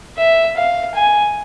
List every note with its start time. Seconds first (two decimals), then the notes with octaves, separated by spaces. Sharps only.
0.18 E5
0.57 F5
0.95 G#5